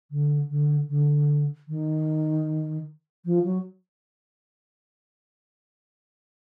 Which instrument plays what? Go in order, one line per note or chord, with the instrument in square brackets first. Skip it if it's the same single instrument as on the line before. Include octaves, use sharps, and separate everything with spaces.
[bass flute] D3
D3
D3
D#3
F3
F#3